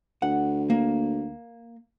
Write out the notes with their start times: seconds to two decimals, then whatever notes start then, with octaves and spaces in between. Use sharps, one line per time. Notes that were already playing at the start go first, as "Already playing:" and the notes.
0.22 D2 F#5
0.70 A#3